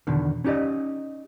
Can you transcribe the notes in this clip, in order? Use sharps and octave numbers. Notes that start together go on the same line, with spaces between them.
E2 B2 D3 D#3
C#4 D#4 G4 D5 D#5